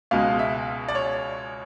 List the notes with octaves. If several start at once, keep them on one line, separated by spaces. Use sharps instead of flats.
C#2 B2 G#3 F5
E5
D5
C#5